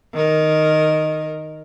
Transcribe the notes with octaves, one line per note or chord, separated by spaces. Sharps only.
D#3 A#4